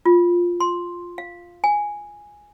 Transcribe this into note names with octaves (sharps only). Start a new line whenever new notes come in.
F4
C6
F5
G#5